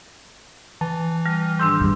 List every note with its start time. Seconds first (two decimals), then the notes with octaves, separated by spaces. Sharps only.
0.81 E3 A5
1.26 G3 F6
1.59 G#2 D#3 D4 C6 E6 G6
1.80 E2 G2 A#2 G3